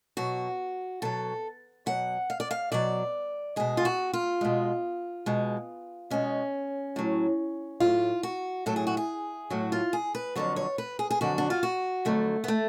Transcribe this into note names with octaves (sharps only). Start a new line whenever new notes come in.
B2 F#3 F#4
B2 F#3 A4
B2 F#3 F#5
F5
D5
F5
B2 F#3 D5
B2 G#3 G#4
F4
F#4
F4
B2 G#3
B2 G#3
B2 G#3 C#4
A2 F#3
A2 F#3 F4
F#4
A2 F#3 A4
G#4
F#4
G#4
A2 F#3 F#4
F4
G#4
B4
F2 D3 F#3 C#5
C#5
B4
G#4
G#4
F2 D3 F#3 F#4
D4
F4
F#4
F2 D3 F#3 A3
B3
A3